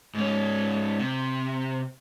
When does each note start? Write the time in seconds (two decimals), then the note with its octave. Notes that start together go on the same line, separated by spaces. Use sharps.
0.14 G#2 C#4
0.99 C3